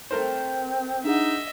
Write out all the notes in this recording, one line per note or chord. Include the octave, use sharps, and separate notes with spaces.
A3 C4 A#4 C5
D4 D#4 G#4 D#5 E5 F#5